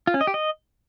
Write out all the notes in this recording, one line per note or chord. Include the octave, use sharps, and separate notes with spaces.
F4
C#4
D#5
G4
D#5